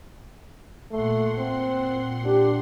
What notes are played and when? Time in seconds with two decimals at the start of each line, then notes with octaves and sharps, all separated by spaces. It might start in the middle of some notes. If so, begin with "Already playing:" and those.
0.91 A#2 A3 F#5 C6
1.38 C4
2.25 D4 G4